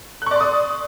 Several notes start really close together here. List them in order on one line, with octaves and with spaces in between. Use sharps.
F#6 C#6 D5 C6 D#6